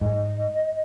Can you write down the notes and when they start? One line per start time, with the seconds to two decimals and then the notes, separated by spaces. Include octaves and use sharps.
0.01 G#2 D#5